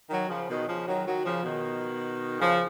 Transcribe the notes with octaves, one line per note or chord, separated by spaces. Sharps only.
D#3 F#3
C#3 F3
B2 D#3
C#3 F3
D#3 F#3
D#3 F#3
C#3 F3
B2 D#3
C#3 F3